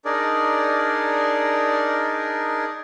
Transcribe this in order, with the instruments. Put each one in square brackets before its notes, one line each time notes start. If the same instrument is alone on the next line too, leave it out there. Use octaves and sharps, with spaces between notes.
[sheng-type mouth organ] D4 D#4 G#4 A#4 D5